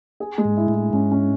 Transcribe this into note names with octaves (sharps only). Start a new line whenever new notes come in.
G#4
G#3
G#2
E4
A2
E4
G#2 C#4
C#4